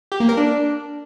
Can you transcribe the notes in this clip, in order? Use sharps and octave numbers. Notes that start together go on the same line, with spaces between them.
G4
A#3
A#4
D4